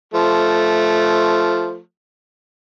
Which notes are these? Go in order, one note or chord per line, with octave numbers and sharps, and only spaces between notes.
F3 A3